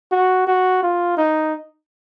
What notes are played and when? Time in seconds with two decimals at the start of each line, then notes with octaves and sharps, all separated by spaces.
0.12 F#4
0.47 F#4
0.83 F4
1.17 D#4